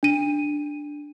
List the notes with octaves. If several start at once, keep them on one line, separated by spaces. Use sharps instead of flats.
D4 D#7